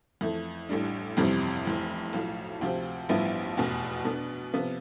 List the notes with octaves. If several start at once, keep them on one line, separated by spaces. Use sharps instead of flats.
F2 E3 A3
A1 A2 G3 D4
G1 F2 C3 E3 G3
F1 F2 E3
B1 A2 F3
D2 C3 F3 C4 G4
A1 G2 F3 B3 E4
F1 E2 B2
B2 B3 D4
C3 F3 B3